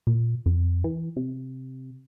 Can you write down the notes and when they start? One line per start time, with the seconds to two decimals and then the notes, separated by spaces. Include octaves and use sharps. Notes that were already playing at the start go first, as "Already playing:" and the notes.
0.07 A#2
0.46 F2
0.84 E3
1.16 C3